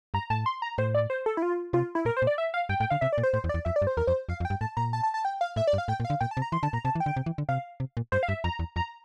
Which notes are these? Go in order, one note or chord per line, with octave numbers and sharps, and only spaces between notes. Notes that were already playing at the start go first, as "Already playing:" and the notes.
G2 A#5
A2 A5
C6
A#5
A2 C5
D5
C5
A4
E4
F4
C3 F4
E4
A#2 A#4
C5
A#2
D5
E5
F5
G2 G5
A2 G5
D3 F5
C3 E5
D5
A#2
C5
A2 C5
E2
D5
E2
F2 E5
D5
G2
C5
E2 A#4
F2 C5
F2 F5
F2
G5
G2
A2 A5
A#2 A#5
A5
A5
A5
G5
F5
A2 E5
D5
G2
F5
A2 G5
A#2
F5
D3
A#2 G5
A5
C3
A#5
E3 C6
D3 A5
A#2 A#5
C3 A5
E3
G5
D3
C3
E3
D3
C3 F5
C3
A#2
G2 C5
F5
G2 E5
F2 A#5
E2
F2 A#5